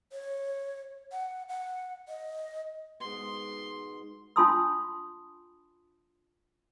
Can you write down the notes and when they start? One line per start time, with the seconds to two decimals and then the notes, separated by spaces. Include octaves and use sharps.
0.12 C#5
1.12 F#5
1.49 F#5
2.09 D#5
3.00 G#2 B2 C6
4.36 D4 F4 A5 C6 D#6 E6